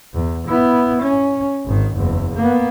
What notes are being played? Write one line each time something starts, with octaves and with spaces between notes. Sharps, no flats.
E2
B3 E4
C#4
G#1 D#3
F#1 E2
A#3 B3